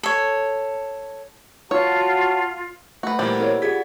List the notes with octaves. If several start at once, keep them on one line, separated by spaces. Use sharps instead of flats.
A4 C#5
F4 F#4 C#5 A5
A3 F#4 B4
A#2 E3 G3 A#3 C5 D5 F#5
E4 A#4 C#5
F4 G4 G#4 D5 F#5 G#6 B6